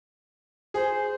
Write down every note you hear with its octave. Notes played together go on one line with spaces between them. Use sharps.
G#4 C5